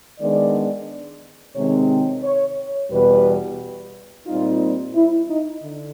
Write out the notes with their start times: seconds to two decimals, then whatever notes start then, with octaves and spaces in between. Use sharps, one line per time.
0.20 D#3 G#3 B3 D4 D5
1.55 C3 D#3 G#3 C4 C#5
2.23 C#5
2.91 E2 B2 G3 B4
4.27 A#2 G3 C4 D#4 F4
4.95 E4
5.29 D#4
5.63 D3